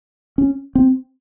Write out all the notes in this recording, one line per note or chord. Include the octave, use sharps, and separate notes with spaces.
C#4
C4